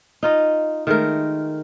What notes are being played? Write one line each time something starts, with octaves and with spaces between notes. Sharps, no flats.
D#4 F4 D#5
D#3 G#3 A3 A#4